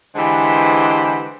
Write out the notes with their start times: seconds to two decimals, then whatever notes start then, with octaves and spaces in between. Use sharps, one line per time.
0.16 D3 E3 G#3 G4 B4 C5